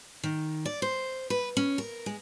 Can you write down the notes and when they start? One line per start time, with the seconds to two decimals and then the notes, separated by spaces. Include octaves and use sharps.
0.23 D#3
0.65 D5
0.82 C5
1.30 B4
1.57 C#4
1.78 A#4
2.06 G#3